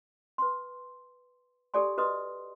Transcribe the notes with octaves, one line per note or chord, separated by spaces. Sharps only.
B4 C6
G4 A4 A#4 D5 G#5 C6
F#4 A#4 B4 D#5 C6 D#6